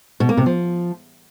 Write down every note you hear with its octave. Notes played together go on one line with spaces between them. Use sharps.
B2
A#3
C3
F3